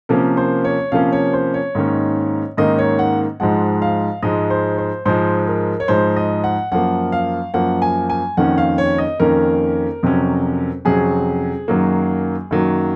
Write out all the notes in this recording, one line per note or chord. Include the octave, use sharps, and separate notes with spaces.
C3 F3 A#3 C#4 A#4
C5
C#5
C3 F3 A#3 C#4 F5
C#5
C5
C#5
G#2 D#3 A#3 C#4
G#2 D#3 A#3 C#4 D#5
C#5
F#5
G#2 F3 G#3 F#5
F5
G#2 F3 G#3 D#5
C5
C5
G#2 F3 G#3 C5
A#4
C#5
G#2 F3 G#3 C5
D#5
F#5
F#2 F3 A#3 F#5
F5
F#2 F3 A#3 F#5
G#5
G#5
F2 D#3 A#3 C#4 F#5
F5
C#5
D#5
F2 D#3 A#3 C#4 A#4
F2 C3 F#3 C#4
F2 C3 F#3 C#4 G#4
F#2 D#3 F#3 A#3
F#2 D#3 F#3 A#3